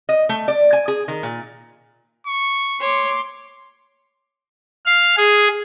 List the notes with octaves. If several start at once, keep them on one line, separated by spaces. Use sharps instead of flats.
D#5
A3
D5
G#5
G#4
D#3
A#2
C#6
C#5 C6 D6
F5
G#4